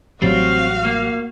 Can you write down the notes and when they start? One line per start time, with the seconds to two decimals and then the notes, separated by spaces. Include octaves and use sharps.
0.22 A1 F#3 G3 C4 F#4 F5
0.85 A#3